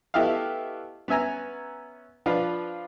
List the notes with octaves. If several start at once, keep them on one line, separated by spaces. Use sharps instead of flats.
A3 B3 E4 G4 D#5 F5
B3 C#4 E5 G#5 A#5
F3 D4 F4 B4